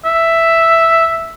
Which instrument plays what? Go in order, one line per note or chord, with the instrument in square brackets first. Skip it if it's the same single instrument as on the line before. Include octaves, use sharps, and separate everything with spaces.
[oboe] E5